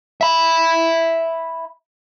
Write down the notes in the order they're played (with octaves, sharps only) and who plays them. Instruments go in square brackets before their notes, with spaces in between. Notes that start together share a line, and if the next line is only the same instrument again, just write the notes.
[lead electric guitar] E5 B5